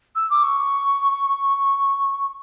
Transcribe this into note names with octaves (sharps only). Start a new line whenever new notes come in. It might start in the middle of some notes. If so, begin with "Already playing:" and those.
E6
D6
C#6